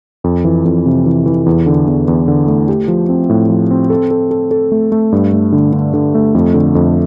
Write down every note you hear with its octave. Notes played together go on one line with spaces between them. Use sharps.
F2
E3
F2
C3
E3
E3
E2
D3
E2
E2
D3
A3
G4
F3
C4
A2
F3
C4
A4
A4
A4
A4
A3
A3
G2
A3
D3
D3
D3
A3
F2
D3
F2